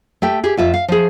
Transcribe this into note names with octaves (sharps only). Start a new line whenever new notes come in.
A3 G4 G5
G4 G#4
F2 F4 E5
F5
F3 G#4